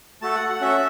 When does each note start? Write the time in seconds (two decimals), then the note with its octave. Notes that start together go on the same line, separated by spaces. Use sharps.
0.22 A3 F#4 A4 A5
0.35 F#5
0.49 F#5
0.61 C#4 F#4 A4 E5